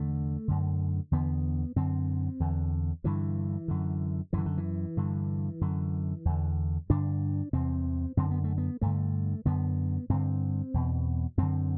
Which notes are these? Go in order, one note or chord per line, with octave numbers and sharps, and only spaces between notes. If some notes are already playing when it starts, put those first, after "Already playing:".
Already playing: E2 D3 A3
F#2 D3
E2 D3 B3
F#2 D3 C4
E2 D3
G2 D3 E3
F#2 D3
F#2 D3 E3
D3
E3
G2 D3
F#2 D3
E2 D3
G2 D3 D4
E2 C3 C4
F#2 D3 C4
B3
A3
B3
G2 D3 A3
F#2 D3 B3
G2 D3 C4
E2 B2
F#2 D3 C4